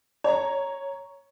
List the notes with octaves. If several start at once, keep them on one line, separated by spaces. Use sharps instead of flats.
C#5 A#5